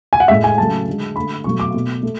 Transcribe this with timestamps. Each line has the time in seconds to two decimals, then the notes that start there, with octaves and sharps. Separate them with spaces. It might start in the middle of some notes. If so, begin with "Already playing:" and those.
0.13 G#5
0.20 F#5
0.28 A2 G#3 E5
0.44 G#5
0.58 C#3 F#3 A3 A5
0.87 D3 G#3
1.15 D3 B5
1.20 A3
1.44 B2 F#3 A3 C#6
1.60 D6
1.74 B2 A3
2.03 A3